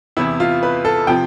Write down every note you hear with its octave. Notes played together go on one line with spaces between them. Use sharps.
E2 C3 E3 B3 E4
F4
B4
A4
C3 F3 G5